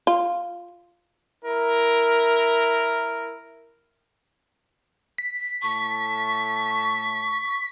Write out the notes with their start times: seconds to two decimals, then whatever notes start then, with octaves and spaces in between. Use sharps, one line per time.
0.07 F4
1.44 E4 A#4
5.18 B6
5.62 A2 A5 C#6